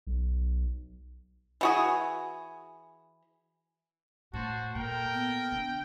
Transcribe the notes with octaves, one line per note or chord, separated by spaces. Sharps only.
B1
E3 F#4 G#4
A2 F#4 C5 A5
A#2 A4 A#4 G5
B3
D3